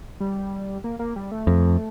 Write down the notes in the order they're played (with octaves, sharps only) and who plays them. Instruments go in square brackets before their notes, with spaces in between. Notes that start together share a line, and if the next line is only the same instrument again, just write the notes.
[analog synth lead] G3
A#3
A#3
G3
A3
[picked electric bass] F2